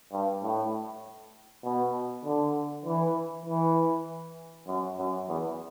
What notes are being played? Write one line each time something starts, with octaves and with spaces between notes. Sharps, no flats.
G2
A2
B2
D3
E3
E3
F#2
F#2
E2